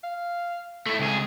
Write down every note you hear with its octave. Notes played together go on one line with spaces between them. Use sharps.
F5
A3 E4 A4
C#2 C4 G#4